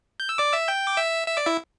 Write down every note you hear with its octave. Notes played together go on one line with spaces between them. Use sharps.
G6
E6
D5 D6
E5 E6
G5 G6
D6
E5 E6
E5 E6
D5 D6
E4 E5